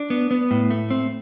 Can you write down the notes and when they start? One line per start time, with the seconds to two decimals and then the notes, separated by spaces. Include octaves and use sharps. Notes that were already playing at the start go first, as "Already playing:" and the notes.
Already playing: D4
0.10 B3
0.31 B3
0.51 A2
0.71 A3
0.90 C4